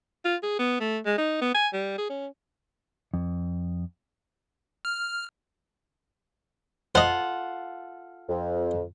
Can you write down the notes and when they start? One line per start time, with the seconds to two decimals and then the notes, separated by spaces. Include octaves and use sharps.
0.25 F4
0.43 G#4
0.59 B3
0.80 A3
1.05 G#3
1.18 D#4
1.42 B3
1.55 G#5
1.73 G3
1.98 G#4
2.10 C#4
3.14 F2
4.85 F6
6.95 F4 A4 C5 D#5 F#5
8.29 F2